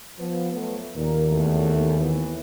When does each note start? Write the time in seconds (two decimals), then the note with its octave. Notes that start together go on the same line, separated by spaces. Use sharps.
0.19 F3 B3
0.53 F#3 A3 B3
0.96 D#2 A#2 A#4
1.30 E2 A3
1.99 E3 B3 C#5